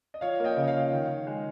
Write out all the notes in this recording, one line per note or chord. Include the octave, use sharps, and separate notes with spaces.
D#5
F3 C#5 F5
A#3
D#5 G5
C#3
C#5 F5
F3
D#3
D#3
G#3